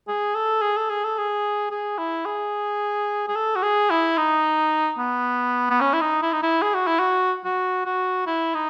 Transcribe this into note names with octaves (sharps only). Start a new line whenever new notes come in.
G#4
A4
G#4
A4
G#4
A4
G#4
G#4
E4
G#4
G#4
A4
F#4
G#4
E4
D#4
B3
B3
C#4
E4
D#4
E4
D#4
E4
G#4
F#4
E4
F#4
F#4
F#4
E4
D#4